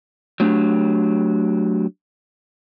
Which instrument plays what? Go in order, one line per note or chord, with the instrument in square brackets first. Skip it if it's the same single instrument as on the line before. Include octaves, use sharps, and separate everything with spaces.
[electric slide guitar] F#3 A3 D4 G4